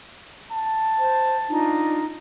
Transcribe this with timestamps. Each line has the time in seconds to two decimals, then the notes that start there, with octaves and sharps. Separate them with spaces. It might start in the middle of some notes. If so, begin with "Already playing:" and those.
0.51 A5
0.99 C5
1.48 D4 D#4 F4